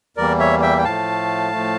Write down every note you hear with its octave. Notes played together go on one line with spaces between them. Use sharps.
E2 E3 G3 A#3 A#4 D5
C#5 E5
E5 G5
G5
A2 F3 A3 F5 A5
A2 F3 A3